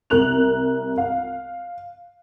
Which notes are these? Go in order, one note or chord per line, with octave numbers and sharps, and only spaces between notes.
C2 A#4 F#6 F7
F5